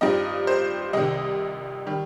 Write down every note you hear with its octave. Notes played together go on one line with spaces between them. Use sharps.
G2 F3 C4 D#4 D#5
C5
C2 C3 D#3 D#5
D#3 G3